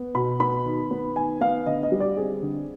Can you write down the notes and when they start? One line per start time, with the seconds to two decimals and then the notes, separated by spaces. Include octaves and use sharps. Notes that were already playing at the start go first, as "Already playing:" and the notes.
Already playing: B3
0.15 B2 B5
0.40 B3 B5
0.65 D#3
0.91 B3
1.16 D#3 G#5
1.41 B3 F5
1.66 D3 D#5
1.83 D#5
1.92 G3
2.00 D5
2.17 C4 G#4
2.42 D3